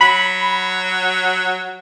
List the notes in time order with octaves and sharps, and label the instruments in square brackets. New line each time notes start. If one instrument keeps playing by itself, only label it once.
[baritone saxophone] F#3 [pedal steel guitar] B5